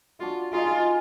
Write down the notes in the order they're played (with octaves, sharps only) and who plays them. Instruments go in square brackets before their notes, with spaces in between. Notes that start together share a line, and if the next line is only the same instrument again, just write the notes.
[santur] D4 F#4 D5 F5 [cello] F4
[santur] G#3 D#4 G#4 D#5 [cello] F4